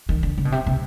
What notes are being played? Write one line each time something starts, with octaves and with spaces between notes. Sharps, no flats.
D#3
D3
C#3
B2
C3
C3